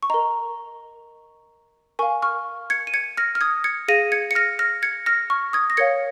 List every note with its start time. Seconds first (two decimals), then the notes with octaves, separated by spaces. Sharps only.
0.03 C#6
0.10 A#4 D#5 A#5
1.99 A#4 F5 G#5 C#6
2.22 C#6 F6
2.70 G#6 C#7
2.87 D#7
2.94 G#6 C#7
3.17 F6 A#6
3.35 F6
3.41 D#6 G#6
3.64 G#6 C#7
3.88 G#4 F5 A#6 D#7
4.12 G#6 C#7
4.31 C#7
4.35 F6 A#6
4.59 F6 A#6
4.83 G#6 C#7
5.06 F6 A#6
5.30 C#6 F6
5.53 D#6 G#6
5.70 A#6
5.77 A#4 C#5 F5 G#6 C#7